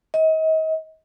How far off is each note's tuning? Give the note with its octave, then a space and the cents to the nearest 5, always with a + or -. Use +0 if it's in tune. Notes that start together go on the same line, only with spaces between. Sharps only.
D#5 +35